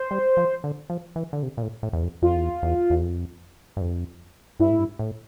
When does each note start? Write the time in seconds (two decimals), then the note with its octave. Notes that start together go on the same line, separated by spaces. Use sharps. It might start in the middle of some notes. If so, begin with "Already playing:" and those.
Already playing: C5
0.11 G3
0.37 F3
0.64 D3
0.90 F3
1.16 E3
1.33 D3
1.43 C3
1.57 A#2
1.62 A2
1.83 A2
1.93 E2
2.03 F2
2.22 F2 F4
2.36 E2
2.63 E2
2.90 E2
3.01 F2
3.77 G2
3.81 F2
4.60 G2 E4
4.70 A2
4.79 G2
4.99 A2